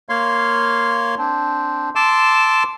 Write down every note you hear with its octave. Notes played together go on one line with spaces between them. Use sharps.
A#3 C#5 F5 C6
C4 D4
A5 C6 D6 E6